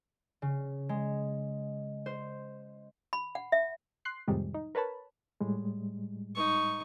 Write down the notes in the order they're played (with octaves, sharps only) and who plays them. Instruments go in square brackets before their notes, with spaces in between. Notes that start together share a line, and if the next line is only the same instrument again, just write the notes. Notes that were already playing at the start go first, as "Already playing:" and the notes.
[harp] C#3
G#3
C5
[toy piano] B5
F#5
E5
[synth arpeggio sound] C6 F#6 C7
F2 A2 C3 D#3 G3 G#3
D#4
A#4 B4 C#5 A5 B5
[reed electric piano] A2 G3 G#3
[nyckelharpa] D#4 C#6